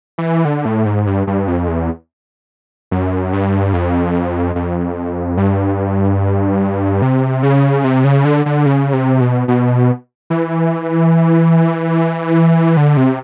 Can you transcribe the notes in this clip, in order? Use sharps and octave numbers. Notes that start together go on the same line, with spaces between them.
E3
D3
A2
G#2
G2
G2
F2
E2
F#2
G2
F2
F2
G2
C3
C#3
C3
C#3
D3
D3
C#3
C3
B2
B2
E3
D3
C3